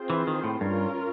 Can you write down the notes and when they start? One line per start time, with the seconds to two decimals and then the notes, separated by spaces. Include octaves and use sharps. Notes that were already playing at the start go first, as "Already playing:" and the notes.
Already playing: C4 F4 G#4 C5
0.10 E3
0.27 D#3
0.44 A2
0.61 G2 C#4 F4 A#4